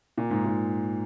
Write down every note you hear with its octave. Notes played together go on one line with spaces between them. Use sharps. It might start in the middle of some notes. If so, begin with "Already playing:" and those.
A#2
G#2
A#2